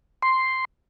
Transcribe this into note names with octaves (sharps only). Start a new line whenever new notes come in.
C6